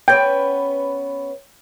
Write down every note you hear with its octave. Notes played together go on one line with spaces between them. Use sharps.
B3 C#4 B4 G5